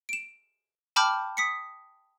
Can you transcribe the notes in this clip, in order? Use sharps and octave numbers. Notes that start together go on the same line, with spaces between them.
D7 E7
G5 A5 B5 D6 F6 G6
D#6 B6 C#7